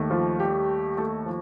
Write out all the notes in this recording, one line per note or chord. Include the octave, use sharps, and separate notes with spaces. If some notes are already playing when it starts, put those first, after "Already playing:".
Already playing: D#2 D#3 A3
F3 F4
G3 G4
A3 A4
F3